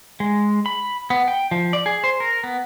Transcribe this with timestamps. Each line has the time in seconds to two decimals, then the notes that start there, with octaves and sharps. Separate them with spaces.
0.20 G#3
0.66 B5
1.10 B3
1.28 G5
1.51 F3
1.73 D5
1.86 G#4
2.04 C5
2.20 A#4
2.44 B3